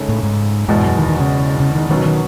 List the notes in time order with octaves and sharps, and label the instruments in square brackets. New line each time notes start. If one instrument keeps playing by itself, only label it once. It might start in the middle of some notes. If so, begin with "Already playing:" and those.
Already playing: [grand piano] C#3 G#3 D#4 A4 C#5
[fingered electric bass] A2
G#2
[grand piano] E2 B2 G#3 [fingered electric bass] G#2
[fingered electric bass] F#2
D#3
D#3
C#3
C#3
D#3
[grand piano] B2 F#3 C#4 F#4 [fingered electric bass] D#3
[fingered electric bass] D#3